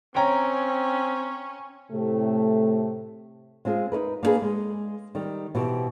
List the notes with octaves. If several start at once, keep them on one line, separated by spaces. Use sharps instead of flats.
C4 C#4 C#5 G5 A#5
A2 C3 A3
G#3 C4 F4 G#4
D#4 E4 A#4 B4
A#3 B3 D4 G#4 B4
G#3
D#3 G3
B2 E3 C4 G4